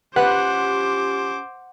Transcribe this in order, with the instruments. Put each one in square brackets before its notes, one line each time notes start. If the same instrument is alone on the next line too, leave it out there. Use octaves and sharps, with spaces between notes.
[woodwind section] C#4 F4 G4 [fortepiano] B4 [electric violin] C5 D6 [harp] F#5